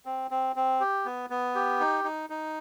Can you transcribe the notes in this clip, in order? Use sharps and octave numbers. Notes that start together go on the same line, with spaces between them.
C4
C4
C4
G4
B3
B3
G4
D#4
D#4
D#4